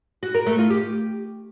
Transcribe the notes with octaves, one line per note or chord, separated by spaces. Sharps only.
F#4
A#4
A3
F4
G4